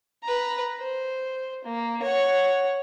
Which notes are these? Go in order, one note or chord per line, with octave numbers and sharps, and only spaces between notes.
B4 A#5
C5
A#3
C#5 F#5